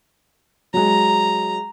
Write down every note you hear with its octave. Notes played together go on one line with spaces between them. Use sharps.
F#3 G#3 A#5